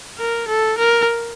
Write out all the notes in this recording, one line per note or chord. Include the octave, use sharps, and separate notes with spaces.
A#4
A4
A#4